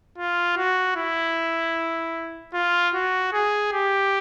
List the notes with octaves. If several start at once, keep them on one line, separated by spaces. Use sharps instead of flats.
F4
F#4
E4
F4
F#4
G#4
G4